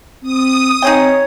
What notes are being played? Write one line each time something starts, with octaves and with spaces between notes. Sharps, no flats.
C4 D#6
C4 D#4 G#4 C#5 G5